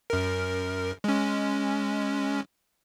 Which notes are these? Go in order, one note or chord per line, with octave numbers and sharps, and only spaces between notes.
F#2 A#4
G#3 C#4